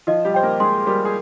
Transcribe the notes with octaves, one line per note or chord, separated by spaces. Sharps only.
F3 F4 D#5
G3 G4
C5 G5
A#3 A#4
G#3 G#4 C6
G3 G4 A#4
G#4